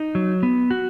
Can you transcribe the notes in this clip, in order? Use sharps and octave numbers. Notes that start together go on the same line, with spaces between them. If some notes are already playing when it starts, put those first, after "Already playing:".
Already playing: D#4
F#3
B3
F#4